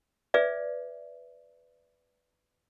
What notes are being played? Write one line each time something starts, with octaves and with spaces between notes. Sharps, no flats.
G#4 B4 D5 E5